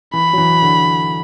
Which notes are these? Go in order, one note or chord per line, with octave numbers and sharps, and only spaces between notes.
E3 B5
F#3
E3
D3